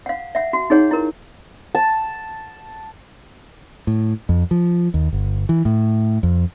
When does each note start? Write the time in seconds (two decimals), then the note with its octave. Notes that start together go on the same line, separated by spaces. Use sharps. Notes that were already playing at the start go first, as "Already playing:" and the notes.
0.06 F5 F#5
0.35 E5 F#5
0.53 F#4
0.70 D#4 G#4 C#5 F#5
0.91 E4 A#4
1.75 A5
3.87 A2
4.29 F2
4.51 F3
4.94 D#2
5.13 G1
5.49 E3
5.65 A2
6.23 F2